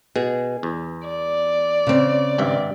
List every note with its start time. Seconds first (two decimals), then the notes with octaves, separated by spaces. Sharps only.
0.16 B2 G#4
0.63 E2
1.07 D5
1.87 C#3 C4
2.38 G#1 G2 E5